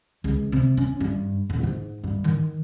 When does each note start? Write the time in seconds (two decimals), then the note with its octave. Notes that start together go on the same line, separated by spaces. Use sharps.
0.24 C#2
0.52 C3
0.77 C#4
1.00 G2
1.50 D#1
1.63 G#2
2.04 G2
2.24 D#3